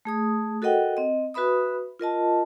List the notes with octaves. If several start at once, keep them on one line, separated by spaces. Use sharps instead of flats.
A3 G#4 D#6
F#4 A4 A#4 D#5 F#5 G5
C4 D#5
F#4 B4 E5 B5 D#6
F4 A#4 D#5 A5